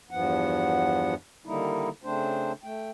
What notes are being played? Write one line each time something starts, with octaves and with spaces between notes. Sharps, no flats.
E2 G2 F3 B3 F#5
D3 D#3 G3 A#3 D#4 E4
C#3 A3 C4 D4 C5
A3 G5